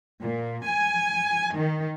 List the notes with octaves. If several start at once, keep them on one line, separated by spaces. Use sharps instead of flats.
A#2
G#5
D#3